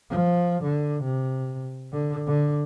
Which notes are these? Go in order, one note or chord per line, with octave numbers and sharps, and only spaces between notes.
F3
D3
C3
D3
D3